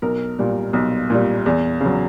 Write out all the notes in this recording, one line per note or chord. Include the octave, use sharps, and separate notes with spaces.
B1 A#4
A#2 G3
B1
A#2 G3
E2
C#3
F#3